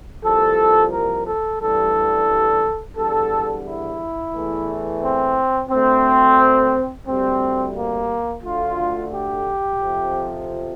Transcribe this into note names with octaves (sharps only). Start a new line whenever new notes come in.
C2 A#2 F3 A4
A#4
A4
A1 G2 E3 G3 A4
E2 D3 G3 A4
E4
E2 E3 A3
C4
D2 D3 A3 C4
D2 C3 G3 C4
A#3
D2 D3 A3 F4
G4
F2 C3 F3